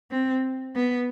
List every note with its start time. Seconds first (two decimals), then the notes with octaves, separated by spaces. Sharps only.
0.11 C4
0.75 B3